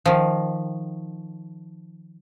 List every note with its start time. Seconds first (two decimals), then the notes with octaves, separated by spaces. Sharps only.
0.06 D#3 F3